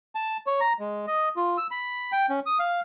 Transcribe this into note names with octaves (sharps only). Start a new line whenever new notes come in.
A5
C#5
A#5
G#3
D#5
F4
E6
B5
G5
C#4
D#6
F5